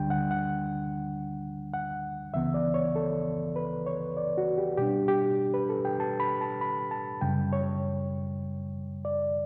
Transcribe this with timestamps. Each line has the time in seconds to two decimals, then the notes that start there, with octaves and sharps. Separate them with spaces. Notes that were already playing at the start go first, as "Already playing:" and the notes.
Already playing: D2 D3 G3 D4 G5
0.10 F#5
0.31 F#5
1.74 F#5
2.34 C#2 C#3 E3 B3 E5
2.54 D5
2.74 C#5
2.96 A4
3.56 B4
3.86 C#5
4.17 D5
4.38 F#4
4.58 G4
4.77 B2 G3 D4 G4
5.08 G4
5.54 B4
5.69 A4
5.85 G5
6.00 A5
6.20 B5
6.41 A5
6.61 B5
6.91 A5
7.21 F#2 C#3 G3 G5
7.53 C#5
9.05 D5